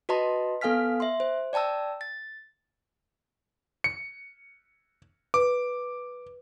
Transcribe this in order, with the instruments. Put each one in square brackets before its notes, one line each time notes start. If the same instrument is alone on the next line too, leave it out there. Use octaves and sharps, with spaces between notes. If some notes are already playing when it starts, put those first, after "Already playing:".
[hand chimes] F#4 B4 D#5 A5 A#5 C6
B3 A4 F5 G#5 F6 B6
E5 C6
C5
D5 G5 A5 A#5 E6
A6
[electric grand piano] C#7
[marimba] B4 [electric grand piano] D6